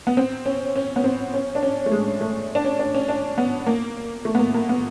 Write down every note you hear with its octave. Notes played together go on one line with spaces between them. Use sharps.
B3
C4
C#4
C#4
B3
C4
C#4
D4
C#4
A3
G#3
A3
D4
C#4
D4
C#4
D4
B3
A#3
A3
B3
A#3
A#3
B3